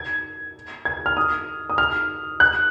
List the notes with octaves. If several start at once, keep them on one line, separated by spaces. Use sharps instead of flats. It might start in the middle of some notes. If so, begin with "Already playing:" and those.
Already playing: G#6
G#6
F6
D#6
D#6
F6
F#6